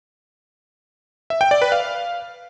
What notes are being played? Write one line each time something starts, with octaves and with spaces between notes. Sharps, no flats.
E5
G5
D5
B4
F5